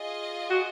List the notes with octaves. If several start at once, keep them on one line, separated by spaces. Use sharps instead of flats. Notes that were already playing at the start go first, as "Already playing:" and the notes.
Already playing: F4 G#4 D#5
F#4